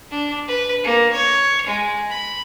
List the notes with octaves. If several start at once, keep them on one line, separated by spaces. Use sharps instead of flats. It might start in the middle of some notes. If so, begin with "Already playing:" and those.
D4
B4
A#3
C#5
G#3
B5